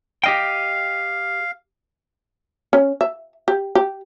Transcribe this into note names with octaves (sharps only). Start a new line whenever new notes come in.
G4 D#5 F5 G5
C#4
E5
G4
G4